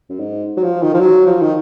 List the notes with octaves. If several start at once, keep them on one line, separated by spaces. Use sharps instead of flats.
F#2
G#2
F#3
F3
D#3
F3
F#3
F3
D#3